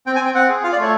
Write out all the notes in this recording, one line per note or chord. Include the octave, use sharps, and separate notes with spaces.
C4 G5
G#5
C4
G5
C4 F#5
G#4
F4 F5
D5
A3 C#5